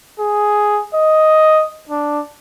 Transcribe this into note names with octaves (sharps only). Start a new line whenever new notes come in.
G#4
D#5
D4